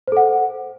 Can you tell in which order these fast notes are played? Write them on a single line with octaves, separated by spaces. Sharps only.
C5 A4 F#5